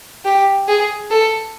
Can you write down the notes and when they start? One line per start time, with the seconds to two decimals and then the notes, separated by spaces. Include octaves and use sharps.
0.25 G4
0.68 G#4
1.11 A4